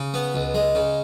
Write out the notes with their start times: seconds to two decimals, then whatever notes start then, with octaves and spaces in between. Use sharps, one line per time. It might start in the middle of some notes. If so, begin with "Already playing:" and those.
Already playing: C#3
0.14 B3
0.34 C#2
0.54 G#3
0.75 C#3